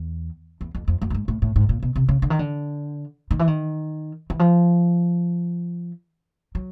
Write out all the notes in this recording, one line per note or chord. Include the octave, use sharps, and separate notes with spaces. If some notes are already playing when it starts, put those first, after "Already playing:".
Already playing: E2
E2
F2
F2
F#2
A2
G#2
A2
A2
G#2
A#2
B2
C3
C#3
D3
D#3
D3
D#3
E3
D#3
E3
F3
F#3